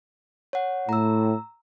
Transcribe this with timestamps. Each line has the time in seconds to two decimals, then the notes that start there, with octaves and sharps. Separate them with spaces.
0.53 C#5 F#5
0.89 A2 A#5 E6